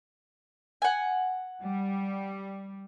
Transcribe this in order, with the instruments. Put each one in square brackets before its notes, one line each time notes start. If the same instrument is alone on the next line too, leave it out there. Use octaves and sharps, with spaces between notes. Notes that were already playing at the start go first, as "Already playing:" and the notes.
[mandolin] F#5 G#5
[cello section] G3